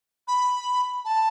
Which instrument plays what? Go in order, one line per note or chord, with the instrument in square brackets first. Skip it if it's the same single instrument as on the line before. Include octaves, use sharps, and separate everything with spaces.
[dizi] B5
A5